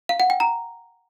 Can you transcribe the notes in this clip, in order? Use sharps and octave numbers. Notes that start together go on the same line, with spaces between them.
F5
F#5
G5
A#5